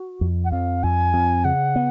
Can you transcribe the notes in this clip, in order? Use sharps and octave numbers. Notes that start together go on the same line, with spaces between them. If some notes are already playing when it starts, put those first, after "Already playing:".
Already playing: F#4
F2
F#5
F2 F5
F2 G#5
F2
C#3 F#5
B3